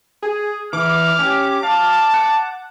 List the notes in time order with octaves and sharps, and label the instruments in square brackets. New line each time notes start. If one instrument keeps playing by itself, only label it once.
[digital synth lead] G#4
[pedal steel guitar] E3 [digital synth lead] D6 [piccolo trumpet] F6
[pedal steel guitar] C#4 G4
[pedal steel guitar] F5 [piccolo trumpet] A5
[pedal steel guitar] F#5